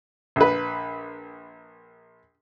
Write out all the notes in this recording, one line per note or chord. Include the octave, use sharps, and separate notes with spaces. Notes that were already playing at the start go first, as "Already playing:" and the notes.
A#1 B4